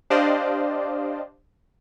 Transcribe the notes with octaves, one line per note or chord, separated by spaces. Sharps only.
D4 G4 C5 D5 D#5 F5